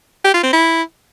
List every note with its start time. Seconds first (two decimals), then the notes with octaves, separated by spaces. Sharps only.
0.24 G4
0.34 F4
0.43 C4
0.53 E4